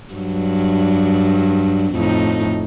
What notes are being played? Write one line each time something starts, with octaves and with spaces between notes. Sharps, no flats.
G2 F#3
F2 A2 D#4